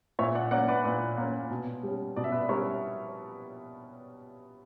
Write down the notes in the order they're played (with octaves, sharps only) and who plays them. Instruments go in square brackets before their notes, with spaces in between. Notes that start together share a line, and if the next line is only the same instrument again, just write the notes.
[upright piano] A#2 C#5 E5
D5 F#5
A#3 C#4 D5 F#5
B4 D5
A#2 B4 D5
A#3 C#4
B2
G3 C#4
B2 D5
E5
B4 D5
G3 C#4 A#4 C#5